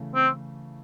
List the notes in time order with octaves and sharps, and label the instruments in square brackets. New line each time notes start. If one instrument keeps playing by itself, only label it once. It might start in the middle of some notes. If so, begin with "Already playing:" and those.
Already playing: [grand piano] C#3 E3 A3
[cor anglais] C4